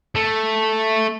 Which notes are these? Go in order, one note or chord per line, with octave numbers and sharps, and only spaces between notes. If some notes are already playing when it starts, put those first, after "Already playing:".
A3